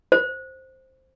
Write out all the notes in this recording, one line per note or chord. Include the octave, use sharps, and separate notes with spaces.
C5